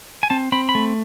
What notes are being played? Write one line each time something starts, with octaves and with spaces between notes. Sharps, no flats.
G#5
C4 A5
C4 B5
B5
A3